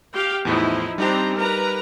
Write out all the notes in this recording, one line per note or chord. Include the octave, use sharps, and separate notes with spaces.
G4 F5 G5
E2 A2 F3 D#4 E4
G3 C4 D4 D#4 G4 A#5
A#4 B4 A#5